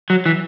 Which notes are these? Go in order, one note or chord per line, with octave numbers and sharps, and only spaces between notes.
F#3
E3